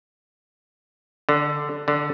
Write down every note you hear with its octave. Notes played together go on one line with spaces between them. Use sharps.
D3
D3